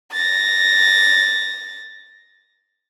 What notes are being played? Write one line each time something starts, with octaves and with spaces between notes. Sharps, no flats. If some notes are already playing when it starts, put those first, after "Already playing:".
A6 A#6